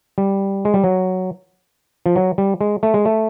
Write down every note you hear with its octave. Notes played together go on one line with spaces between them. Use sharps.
G3
G#3
G3
F#3
F3
F#3
G3
G#3
A3
G#3
A3